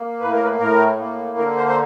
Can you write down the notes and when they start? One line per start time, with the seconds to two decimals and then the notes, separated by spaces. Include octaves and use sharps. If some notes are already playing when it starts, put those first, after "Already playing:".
Already playing: A#3
0.20 A2 B4
0.33 A#4
0.44 B4
0.60 A2 A#4
0.99 A#3
1.37 D3 A#4
1.57 C5
1.68 C5